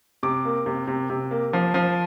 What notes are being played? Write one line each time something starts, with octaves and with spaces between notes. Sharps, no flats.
C3 D6
A#3
C3
C3
C3
A#3
F3
F3